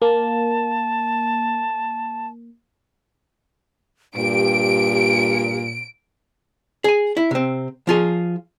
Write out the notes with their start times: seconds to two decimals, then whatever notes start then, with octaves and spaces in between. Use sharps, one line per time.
0.02 A#3 A5
4.16 G2 A#2 G4 D7
6.84 G#4 G#5
7.17 E4
7.31 C3 C4
7.87 F3 F4 G#4